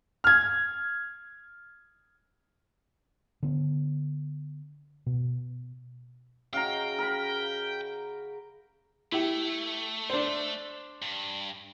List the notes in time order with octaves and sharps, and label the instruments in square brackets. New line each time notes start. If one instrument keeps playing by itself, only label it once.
[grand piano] F6 G#6
[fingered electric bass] D3 B3
B2
[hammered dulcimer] C#3 F#4 D#5 [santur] F5 A#5 [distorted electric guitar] G5
[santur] A#4 B5
[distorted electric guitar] A3 [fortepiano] E4 G4
[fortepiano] D4 C5
[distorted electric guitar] G2